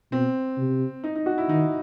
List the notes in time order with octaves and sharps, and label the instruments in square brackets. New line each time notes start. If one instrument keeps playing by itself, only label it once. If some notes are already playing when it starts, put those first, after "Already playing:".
[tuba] B2 [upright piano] C4
[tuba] C3
[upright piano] D#4
D#4
F#4
E4
[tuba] D#3 [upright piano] D#4